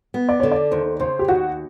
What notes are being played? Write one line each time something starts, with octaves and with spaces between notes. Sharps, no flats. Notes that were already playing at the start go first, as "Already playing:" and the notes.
B3
D5
D3 C#5
D5
D#2 C5
C#3 C5
G4
D#2 F#4